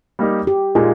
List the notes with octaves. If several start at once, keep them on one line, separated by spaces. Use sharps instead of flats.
G3 A#3 D#4 G4
G4
A#2 G#3 D#4 F4 G#4